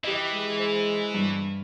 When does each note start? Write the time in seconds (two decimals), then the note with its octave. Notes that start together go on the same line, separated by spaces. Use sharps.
0.04 E3 G4 D#5
0.34 G#3
0.59 C5
1.14 G2